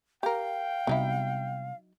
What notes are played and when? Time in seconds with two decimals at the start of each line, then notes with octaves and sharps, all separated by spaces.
0.23 G4 A#4 F5 G5
0.87 C3 F#3 G3 B3 D#4 E4